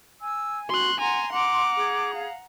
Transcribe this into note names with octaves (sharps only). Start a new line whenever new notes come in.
G#5 E6
F#4 C6 F#6
F#5 G#5 A#5 C6
F#5 A#5 D6
G#4
F5